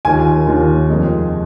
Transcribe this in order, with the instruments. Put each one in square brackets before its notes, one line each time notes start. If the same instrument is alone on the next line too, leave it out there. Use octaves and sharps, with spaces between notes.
[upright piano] D#2 D#3 A#3 F4 [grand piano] G#5
[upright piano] D#2 D#3 A#3 F4
F2 C3 F3 G#3